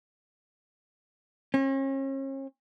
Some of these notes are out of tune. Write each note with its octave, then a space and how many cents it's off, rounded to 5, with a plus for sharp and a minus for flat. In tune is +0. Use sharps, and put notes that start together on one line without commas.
C#4 -40